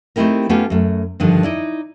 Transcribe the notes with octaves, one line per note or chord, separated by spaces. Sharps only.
A3 C4 D#4 E4 G4 A#4
A3 B3 C#4 F4 G4
F#2 A3
G2 D3 D#3 F3
D#4 E4 D5